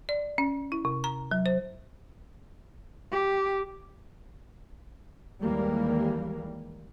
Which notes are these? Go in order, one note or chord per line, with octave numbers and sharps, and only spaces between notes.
D5
C#4
E4
C3
A#5
F#3
C5
G4
D#2 E3 G3 G#3 A#3